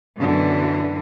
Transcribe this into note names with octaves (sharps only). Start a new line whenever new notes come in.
F#2 B2 D3 E3